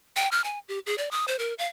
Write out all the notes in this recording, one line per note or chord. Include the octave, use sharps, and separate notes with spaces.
G5
F6
G#5
G4
G#4
D5
D#6
C5
A#4
F5